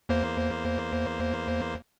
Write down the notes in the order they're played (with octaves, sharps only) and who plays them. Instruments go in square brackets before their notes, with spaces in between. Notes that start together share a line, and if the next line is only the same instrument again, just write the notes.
[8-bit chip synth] E2 A#3 C5